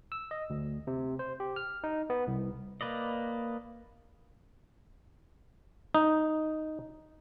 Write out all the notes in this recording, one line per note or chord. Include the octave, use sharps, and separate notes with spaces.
E6
D#5
D2
C3
C5
G4
F6
D#4
B3
C2
A#3 B4 D5 D#5
D#4